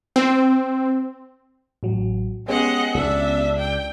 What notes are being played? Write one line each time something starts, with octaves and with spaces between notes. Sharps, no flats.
C4
A1 F#3
G#3 B3 C#4 G4 D#5 F#5
C#2 D4 E5
G5